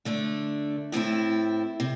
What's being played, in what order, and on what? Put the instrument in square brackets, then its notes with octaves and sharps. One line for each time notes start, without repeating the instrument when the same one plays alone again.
[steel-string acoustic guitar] D3 A3 D4
A2 A3 C4 E4
C3